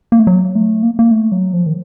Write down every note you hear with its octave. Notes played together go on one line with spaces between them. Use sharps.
A#3
A3
F#3
A3
A#3
A#3
A3
F#3
F3
D#3